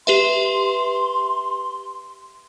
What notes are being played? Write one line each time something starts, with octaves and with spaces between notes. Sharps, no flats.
G4 B4 E5 C6